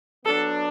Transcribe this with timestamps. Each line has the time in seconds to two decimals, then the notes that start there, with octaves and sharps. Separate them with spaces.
0.25 F#3 B3 D4 A4